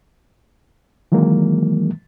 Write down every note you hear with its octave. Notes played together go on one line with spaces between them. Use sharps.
D#3 E3 F#3 G#3 A#3